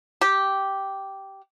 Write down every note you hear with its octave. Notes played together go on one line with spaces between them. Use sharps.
G4